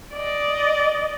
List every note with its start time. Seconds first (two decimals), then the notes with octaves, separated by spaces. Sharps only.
0.14 D5 D#5